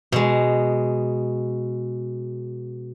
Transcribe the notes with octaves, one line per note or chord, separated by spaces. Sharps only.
B2 G#3